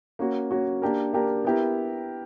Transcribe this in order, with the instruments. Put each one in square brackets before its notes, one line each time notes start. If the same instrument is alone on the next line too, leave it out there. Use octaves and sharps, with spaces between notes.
[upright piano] A#3 C#4 F#4
A#3 C#4 F#4
A#3 D4 G4 A#4
A#3 D4 G4 A#4
B3 E4 G4 A#4